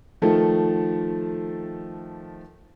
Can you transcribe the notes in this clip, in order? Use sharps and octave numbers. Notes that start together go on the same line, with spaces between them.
D#3 F3 A3 A4